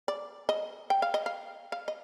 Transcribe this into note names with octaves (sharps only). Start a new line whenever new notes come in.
D5
D#5
G5
F5
D#5
F5
F5
D#5